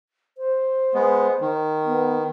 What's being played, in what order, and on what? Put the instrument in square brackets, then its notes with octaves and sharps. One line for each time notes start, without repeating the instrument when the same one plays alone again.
[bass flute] C5
[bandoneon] G#3 B3
D#3
[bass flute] B3